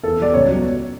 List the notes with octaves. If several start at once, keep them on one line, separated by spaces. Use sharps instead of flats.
E2 A4
B2 G3 D5
C#2 C#5
B2 F#3